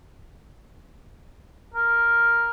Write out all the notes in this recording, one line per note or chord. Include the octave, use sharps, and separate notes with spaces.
A#4